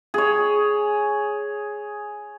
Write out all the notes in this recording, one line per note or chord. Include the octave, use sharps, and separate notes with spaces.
G#4 C#5